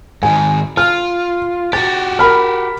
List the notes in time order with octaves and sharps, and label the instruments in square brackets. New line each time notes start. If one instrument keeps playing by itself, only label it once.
[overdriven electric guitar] G#2 D#3 [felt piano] G#5
[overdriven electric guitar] F4 [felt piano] F6
[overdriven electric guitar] F#4 G4 [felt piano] A6
[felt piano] A#4 B5 F6